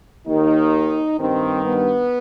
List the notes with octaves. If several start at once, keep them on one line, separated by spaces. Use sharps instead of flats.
D#2 D#3 D#4
G2 D#3 C4
B3